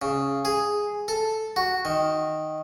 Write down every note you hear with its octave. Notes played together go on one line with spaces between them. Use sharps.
C#3
G#4
A4
F#4
D#3